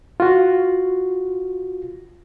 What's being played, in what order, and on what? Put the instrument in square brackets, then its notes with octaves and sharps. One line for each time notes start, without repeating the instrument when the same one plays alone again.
[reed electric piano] F4 F#4